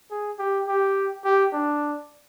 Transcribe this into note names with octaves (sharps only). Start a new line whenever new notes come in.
G#4
G4
G4
G4
D4